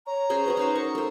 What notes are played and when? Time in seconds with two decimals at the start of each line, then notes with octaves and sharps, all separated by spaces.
0.07 C#5 A#5
0.30 C#4 G#4 C5 C#5
0.46 C#4 F#4 B4 D#5
0.57 C#4 D#4 C5
0.75 A#4 C#6
0.95 A3 C5